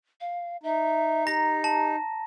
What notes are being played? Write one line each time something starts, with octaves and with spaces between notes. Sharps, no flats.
F5
D#4 E5
G4 A#5 A#6
A5